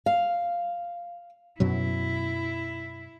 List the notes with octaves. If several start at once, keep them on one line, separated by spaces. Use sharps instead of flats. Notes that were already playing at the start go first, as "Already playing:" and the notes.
F5
F#2 B2 F#3 E4